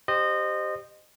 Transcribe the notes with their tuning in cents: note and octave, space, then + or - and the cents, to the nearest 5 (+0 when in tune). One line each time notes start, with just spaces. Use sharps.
G4 +0 C5 +0 D#5 -25